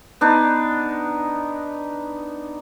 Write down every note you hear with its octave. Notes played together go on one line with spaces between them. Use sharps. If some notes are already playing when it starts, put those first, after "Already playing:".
B3 D4 D#4